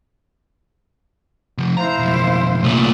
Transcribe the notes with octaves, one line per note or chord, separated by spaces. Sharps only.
C3 F3
E4 C5 F5 A#5
B1 F2
C2 A#2 A3